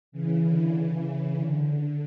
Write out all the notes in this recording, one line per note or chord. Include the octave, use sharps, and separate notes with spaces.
C#3 E3
D3
C#3 E3
D3
D3